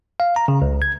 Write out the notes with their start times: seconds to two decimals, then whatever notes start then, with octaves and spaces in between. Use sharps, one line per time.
0.20 F5
0.36 A#5
0.48 C#3
0.62 C#2
0.82 G#6